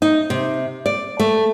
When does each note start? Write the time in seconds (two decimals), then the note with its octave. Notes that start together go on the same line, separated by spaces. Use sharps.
0.02 D#4
0.30 C3
0.86 D5
1.20 A3